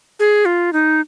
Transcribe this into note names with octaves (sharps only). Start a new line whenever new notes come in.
G#4
F4
D#4